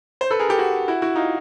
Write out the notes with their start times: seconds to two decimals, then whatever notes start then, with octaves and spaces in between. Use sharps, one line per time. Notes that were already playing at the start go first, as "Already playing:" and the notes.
0.21 C5
0.31 A4 B4
0.39 G#4 A#4
0.49 G4 A4
0.59 F#4 G#4
0.88 E4 F#4
1.02 E4 F#4
1.15 D#4 F4